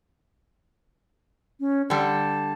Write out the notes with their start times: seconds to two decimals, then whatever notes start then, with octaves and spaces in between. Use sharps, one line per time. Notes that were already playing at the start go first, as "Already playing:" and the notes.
1.60 C#4
1.90 D3 G3 A5